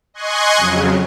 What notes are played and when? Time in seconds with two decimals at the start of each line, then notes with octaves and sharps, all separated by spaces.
0.14 D#5 G#5 C6 C#6 F#6 G#6
0.57 F2 C#3 F#3